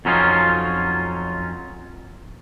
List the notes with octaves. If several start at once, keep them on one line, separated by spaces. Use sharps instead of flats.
F2 F#3 C#4 D#4 F4